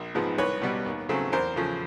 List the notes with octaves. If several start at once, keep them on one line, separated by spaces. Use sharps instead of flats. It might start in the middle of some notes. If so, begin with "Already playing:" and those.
Already playing: A#1
G#2 F3 G#3 B3
C2 B4 C#5
B2 G3 B3
D#2
C#3 F#3 A3 C4
E2 A#4 C5
C#3 F3 A3